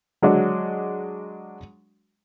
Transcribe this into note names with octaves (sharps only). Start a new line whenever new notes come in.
F#3 G#3 D4 F#4